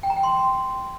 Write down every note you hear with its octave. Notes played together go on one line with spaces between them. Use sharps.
G5
A#5
G5
C6